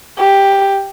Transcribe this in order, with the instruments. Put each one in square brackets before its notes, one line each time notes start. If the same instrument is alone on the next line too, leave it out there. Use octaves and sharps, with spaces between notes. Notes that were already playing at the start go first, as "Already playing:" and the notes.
[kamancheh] G4